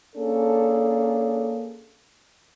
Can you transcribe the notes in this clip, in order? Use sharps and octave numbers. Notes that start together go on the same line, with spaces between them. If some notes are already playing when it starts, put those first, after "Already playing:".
A#3 C#4 D4 G#4 A4